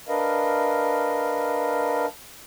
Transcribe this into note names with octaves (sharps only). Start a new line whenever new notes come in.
D4 A#4 B4 D#5 F5